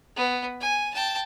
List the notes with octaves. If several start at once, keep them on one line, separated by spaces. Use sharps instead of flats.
B3
G#5
G5 A5